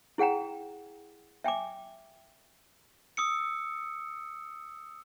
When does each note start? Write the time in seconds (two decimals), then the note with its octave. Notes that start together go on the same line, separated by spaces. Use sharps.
0.18 E4 G#4 F#5 G5 A#5
1.44 E5 G5 G#5 D6
3.17 D#6 E6 C#7